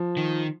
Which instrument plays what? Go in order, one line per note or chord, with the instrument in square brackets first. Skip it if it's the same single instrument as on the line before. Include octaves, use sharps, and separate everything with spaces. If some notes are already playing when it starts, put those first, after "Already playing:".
Already playing: [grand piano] F3
[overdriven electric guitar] D#3